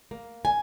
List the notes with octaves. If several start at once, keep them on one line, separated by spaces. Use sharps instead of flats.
A#3
G#5